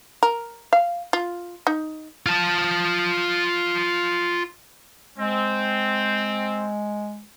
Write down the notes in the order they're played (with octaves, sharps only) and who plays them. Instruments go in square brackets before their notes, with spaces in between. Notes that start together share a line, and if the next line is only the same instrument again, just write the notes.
[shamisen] A#4
F5
F4
D#4
[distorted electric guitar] F4 A5
[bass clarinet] G#3 [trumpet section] C4